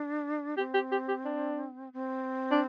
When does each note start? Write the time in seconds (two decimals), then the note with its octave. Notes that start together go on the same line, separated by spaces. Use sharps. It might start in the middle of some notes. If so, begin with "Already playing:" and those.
Already playing: D4
0.57 C4 G4
0.74 G4
0.92 G4
1.08 G4
1.25 D4
1.93 C4
2.51 D4